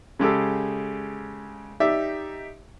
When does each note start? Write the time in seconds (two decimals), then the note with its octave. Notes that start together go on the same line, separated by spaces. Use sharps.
0.19 C#3 G#3 G4 A4
1.80 D#4 G4 D5 E5